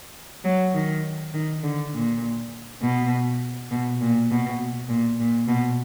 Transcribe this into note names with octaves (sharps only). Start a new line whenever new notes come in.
F#3
D#3
D#3
D3
A#2
B2
B2
A#2
B2
A#2
A#2
B2